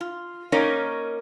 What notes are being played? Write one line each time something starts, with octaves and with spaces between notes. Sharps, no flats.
F4
A#3 C#4 D#4 A#4 C#5